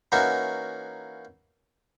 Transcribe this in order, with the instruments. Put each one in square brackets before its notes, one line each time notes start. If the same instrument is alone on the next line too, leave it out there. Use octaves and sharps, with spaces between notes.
[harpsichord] E3 A#3 C#4 D#4 F#4